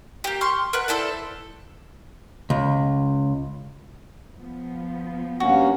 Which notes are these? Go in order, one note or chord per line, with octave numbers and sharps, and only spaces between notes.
A#3 G4
C6 C#6 F6
A#4 B4 F#5
E4 A4 C5 D5
C#2
F3 B3
G2 A#3 C#4 F#4